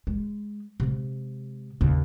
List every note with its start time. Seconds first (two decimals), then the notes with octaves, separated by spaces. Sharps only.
0.07 G#3
0.80 C3 G#3
1.81 D#2 C#3